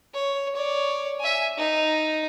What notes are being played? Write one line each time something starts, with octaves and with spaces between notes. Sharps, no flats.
C#5
C#5 D5
E5 G#5
D#4